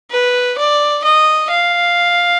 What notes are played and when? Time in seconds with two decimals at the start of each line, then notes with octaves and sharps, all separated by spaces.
0.11 B4
0.57 D5
1.04 D#5
1.50 F5